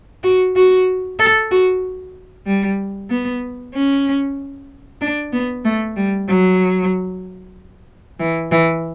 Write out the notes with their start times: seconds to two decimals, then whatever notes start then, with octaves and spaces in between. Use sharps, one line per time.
0.23 F#4
0.56 F#4
1.19 A4
1.51 F#4
2.47 G3
3.10 B3
3.74 C#4
5.01 D4
5.33 B3
5.65 A3
5.96 G3
6.28 F#3
8.19 E3
8.52 E3